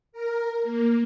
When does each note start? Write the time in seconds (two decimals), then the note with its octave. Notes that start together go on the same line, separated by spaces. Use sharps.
0.12 A#4
0.63 A#3